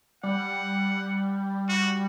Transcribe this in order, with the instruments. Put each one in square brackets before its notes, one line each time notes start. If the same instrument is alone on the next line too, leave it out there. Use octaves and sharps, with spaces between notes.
[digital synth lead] G3 [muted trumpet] F#5
[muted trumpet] F#4